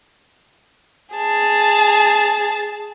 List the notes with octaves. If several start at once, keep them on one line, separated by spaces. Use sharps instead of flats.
G#4 A5